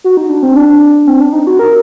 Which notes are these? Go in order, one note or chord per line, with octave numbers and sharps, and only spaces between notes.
F#4
D#4
D4
C4
D4
C4
D4
D#4
F#4
A#4